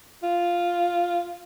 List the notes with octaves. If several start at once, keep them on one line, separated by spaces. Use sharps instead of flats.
F4